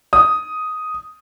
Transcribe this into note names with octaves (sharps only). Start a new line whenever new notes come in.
D#6